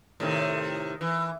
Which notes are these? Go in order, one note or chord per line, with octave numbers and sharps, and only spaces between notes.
A2 C3 D#3
E3